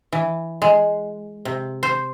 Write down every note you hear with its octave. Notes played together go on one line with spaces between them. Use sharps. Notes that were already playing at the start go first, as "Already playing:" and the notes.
E3
G#3
C3
C5